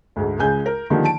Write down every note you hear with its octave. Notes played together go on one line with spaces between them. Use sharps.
D2 G#2
C#2 C#3 G#3 G#5 G6
A#4
D3 D#3 F3 G3 A#3 D#4
A5 D7